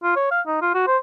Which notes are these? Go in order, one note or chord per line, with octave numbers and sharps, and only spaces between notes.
F4
C#5
F5
D#4
F4
F#4
C5